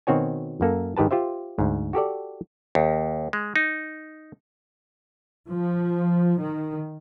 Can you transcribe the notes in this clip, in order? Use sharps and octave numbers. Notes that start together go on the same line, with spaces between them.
B2 D#3 C4 F#4 C#5 G#5
F#2 A#3 A4
G#2 D#3 G4 B4 A5
F4 G4 C5 E5
D2 G#2
F#4 G4 A4 D5
D#2
G#3
D#4
F3
D#3